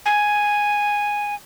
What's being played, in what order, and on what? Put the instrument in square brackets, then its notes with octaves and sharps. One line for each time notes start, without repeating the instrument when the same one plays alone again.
[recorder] G#5